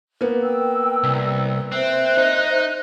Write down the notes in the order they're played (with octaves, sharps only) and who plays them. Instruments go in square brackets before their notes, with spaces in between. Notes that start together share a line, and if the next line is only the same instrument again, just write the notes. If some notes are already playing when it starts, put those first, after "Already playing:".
[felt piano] A#3 B3
[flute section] G5 E6
[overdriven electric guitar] C2
[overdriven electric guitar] C4 [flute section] C5 E5 F#6
[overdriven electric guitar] D#4